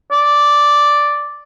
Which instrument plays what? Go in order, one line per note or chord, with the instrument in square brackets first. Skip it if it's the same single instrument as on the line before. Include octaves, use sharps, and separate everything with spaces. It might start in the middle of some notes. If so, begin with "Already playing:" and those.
[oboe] D5